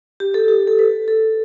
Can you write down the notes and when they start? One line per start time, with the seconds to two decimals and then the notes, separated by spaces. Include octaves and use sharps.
0.20 G4
0.34 A4
0.48 G4
0.67 A4
0.79 B4
1.08 A4